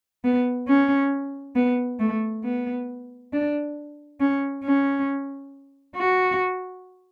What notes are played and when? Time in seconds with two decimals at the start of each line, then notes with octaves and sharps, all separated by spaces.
0.24 B3
0.68 C#4
1.56 B3
2.00 A3
2.44 B3
3.33 D4
4.20 C#4
4.64 C#4
5.96 F#4